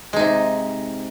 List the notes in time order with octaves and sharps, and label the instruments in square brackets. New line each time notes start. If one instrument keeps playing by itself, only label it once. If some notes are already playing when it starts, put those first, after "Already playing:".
[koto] G#3
D#4
C3